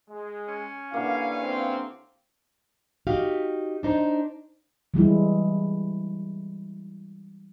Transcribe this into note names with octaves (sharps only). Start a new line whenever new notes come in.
G#3
C#4
D3 A#3 E4 G4 B4 F5
C4 C#4
D#4 F#4 G4 F5
D4 D#4 C5
E3 G3 G#3 E4